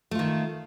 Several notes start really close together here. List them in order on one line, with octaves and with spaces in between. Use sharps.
A3 F4 D#3